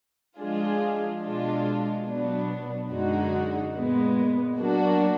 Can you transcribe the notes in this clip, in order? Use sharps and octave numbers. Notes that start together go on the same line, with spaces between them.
F3 G#3 D4 F4 G#4
B2 G#3 D4 F4
B2 F#3 B3 D4
F#2 D3 G#3 D#4 F#4
A#2 G#3 B3
F#3 A#3 D4 F#4